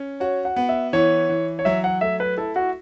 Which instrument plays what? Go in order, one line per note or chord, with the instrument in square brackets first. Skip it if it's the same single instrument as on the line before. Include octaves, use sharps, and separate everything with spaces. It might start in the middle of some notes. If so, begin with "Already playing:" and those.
Already playing: [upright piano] C#4
[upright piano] F#4 [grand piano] C#5
[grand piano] F#5
[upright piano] B3
[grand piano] E5
[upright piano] E3 [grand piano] C#5
[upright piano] E3
[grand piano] C#5
[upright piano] F#3 [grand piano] E5
[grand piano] F#5
[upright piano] A3 [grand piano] E5
[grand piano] B4
[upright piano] E4 [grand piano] A4
[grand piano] F#4